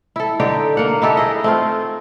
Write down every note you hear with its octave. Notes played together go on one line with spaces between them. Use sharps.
E4 A4
D3 D#4 G4
A#3 F#5
D#4 E4 G4 A4
G#4 D#5
A3 C4 F4